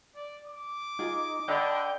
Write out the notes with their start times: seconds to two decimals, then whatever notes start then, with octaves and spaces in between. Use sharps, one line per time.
0.16 D5
0.48 D6
0.99 D#4 F4 G#4
1.48 D3 D4 D#5 G5 B5